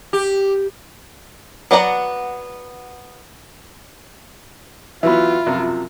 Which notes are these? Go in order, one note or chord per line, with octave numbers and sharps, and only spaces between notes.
G4
F#3 B3 D5 F#5 A#5
E3 F#3 B3 F4 E5 B5
F#2 C3 F3